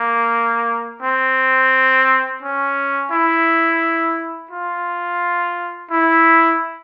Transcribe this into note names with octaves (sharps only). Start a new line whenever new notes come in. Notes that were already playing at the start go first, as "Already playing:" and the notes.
Already playing: A#3
C4
C#4
E4
F4
E4